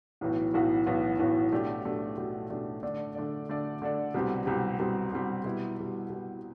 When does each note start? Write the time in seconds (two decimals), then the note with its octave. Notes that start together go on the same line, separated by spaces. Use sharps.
0.21 B1 A2 E3 B3 F#4
0.54 B1 A2 E3 B3 F#4
0.86 B1 A2 E3 B3 F#4
1.19 B1 A2 E3 B3 F#4
1.52 B2 A3 D4 G4
1.85 B2 A3 D4 G4
2.17 B2 A3 D4 G4
2.50 B2 A3 D4 G4
2.83 D3 A3 D4 A4 D5
3.15 D3 A3 D4 A4 D5
3.49 D3 A3 D4 A4 D5
3.82 D3 A3 D4 A4 D5
4.14 C2 B2 G3 C4 G4
4.46 C2 B2 G3 C4 G4
4.79 C2 B2 G3 C4 G4
5.13 C2 B2 G3 C4 G4
5.44 B2 G3 B3 E4
5.77 B2 G3 B3 E4
6.10 B2 G3 B3 E4